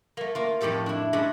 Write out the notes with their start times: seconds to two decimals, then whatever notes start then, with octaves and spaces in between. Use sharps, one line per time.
0.17 A3 A#3
0.35 A#3 F4
0.61 F2 A2 D#3 G4 A4
0.86 D4 E4
1.13 G#3 C#4 D4 G#4 A4 B5